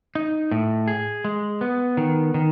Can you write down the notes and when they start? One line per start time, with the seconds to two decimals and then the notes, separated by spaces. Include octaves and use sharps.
0.15 D#4
0.51 A2
0.88 G#4
1.25 G#3
1.61 B3
1.97 D#3
2.34 D#3